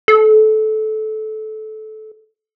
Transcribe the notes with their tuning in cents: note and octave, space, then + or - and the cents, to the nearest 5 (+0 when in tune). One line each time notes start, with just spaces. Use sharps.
A4 -20